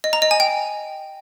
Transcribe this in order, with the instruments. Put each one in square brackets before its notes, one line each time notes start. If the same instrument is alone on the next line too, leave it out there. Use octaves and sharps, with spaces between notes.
[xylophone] D#5
A#5
D#5
G#5
G5